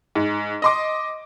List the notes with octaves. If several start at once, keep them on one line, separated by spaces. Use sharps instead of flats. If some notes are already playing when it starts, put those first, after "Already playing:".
G#2
D#5 C6 D6